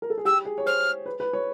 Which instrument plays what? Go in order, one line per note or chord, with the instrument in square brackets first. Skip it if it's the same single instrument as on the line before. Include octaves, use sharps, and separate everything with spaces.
[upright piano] A#4
A4
G#4
[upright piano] G4 [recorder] E6
[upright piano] G#4
C#5
[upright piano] C5 [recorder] F6
[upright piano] B4
B4
C#5